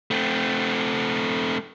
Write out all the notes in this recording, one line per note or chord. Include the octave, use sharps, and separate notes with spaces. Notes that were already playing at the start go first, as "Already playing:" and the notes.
A3 C4